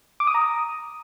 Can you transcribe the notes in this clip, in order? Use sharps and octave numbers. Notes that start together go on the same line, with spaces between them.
D6
D#6
A#5
D#6